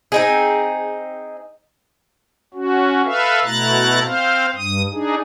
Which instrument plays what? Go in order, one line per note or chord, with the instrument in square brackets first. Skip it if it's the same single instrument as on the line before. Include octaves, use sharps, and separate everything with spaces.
[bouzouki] C4 D#4 G#4
[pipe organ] C#4 F#4
A4 B4 E5 F5
B2 A3 E4 A#5 F#6 A6
C4 C5 F5
G2 D#6
D4 D#4 G#4